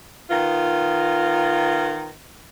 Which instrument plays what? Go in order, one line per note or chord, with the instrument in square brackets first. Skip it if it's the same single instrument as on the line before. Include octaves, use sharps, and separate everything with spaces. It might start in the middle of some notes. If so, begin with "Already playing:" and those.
[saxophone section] D#3 B3 F4